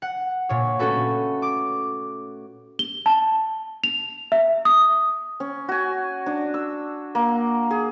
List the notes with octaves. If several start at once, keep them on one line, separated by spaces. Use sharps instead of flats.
F#5
A#2 C#5
A3 C#4 F#4 A4 B4
D6
G7
A5
F7
E5
D#6
C#4
F#4 G#5
D4
E6
A#3
G#4